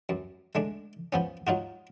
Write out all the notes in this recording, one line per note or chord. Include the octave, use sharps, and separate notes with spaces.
F#2
G#3 A3 D4
F3 B3 C#4
F#3 D#4 F4 F#4